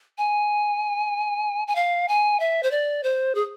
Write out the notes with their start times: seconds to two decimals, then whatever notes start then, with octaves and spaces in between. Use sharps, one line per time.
0.18 G#5
1.68 G#5
1.75 F5
2.08 G#5
2.40 E5
2.63 C5
2.71 D5
3.03 C5
3.35 G#4